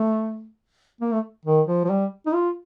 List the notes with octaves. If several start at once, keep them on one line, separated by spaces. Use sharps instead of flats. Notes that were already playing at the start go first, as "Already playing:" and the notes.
Already playing: A3
A#3
A3
D#3
F3
F3
G3
D#4
F4